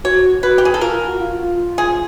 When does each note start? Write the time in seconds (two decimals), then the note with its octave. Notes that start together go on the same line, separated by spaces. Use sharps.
0.04 F#4 C#5
0.43 F#4 B4
0.58 G4
0.65 G#4
0.74 A4
0.81 F4 A#4
0.94 F4
1.07 F#4
1.20 F4
1.78 G#4